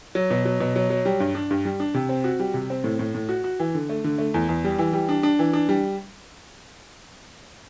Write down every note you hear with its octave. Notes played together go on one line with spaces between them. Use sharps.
F#3
B2
F#3
B2
F#3
F#3
G3
G2
D4
G2
G3
D4
C3
C4
F#4
G3
C3
C4
A2
A2
A2
F#4
F#4
E3
D3
A3
D3
A3
E2
E2
G3
E3
G3
D4
D4
E3
D4
G3